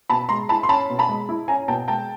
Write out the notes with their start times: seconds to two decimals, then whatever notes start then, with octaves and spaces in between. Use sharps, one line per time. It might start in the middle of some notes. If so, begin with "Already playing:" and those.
0.10 B2 A5 B5
0.29 G#3 A#5 C6
0.49 E4 A5 B5
0.63 C6
0.69 C#4 A5 B5
0.90 B2
0.99 A5 B5
1.09 G#3
1.29 E4
1.48 C#4 G#5 A#5
1.68 B2 G5 A5
1.88 G#3 G5 A5